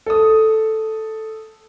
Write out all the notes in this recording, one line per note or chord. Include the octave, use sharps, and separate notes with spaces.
A4 D#6